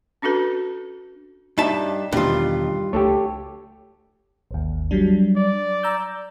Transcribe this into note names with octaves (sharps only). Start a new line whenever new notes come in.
C#4 D4 F#4 A4 B4
G2 D#4 D5 E5 A5
E2 G2 B2 D#3 F4
C#2 A3 G4 A4 C#5
G#1 D#2
F#3 G3 D4
D5
A#5 E6 G6